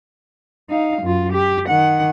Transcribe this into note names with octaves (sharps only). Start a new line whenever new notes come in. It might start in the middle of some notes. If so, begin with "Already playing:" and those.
D#4 F5
F#2 F4
G4
D#3 F#5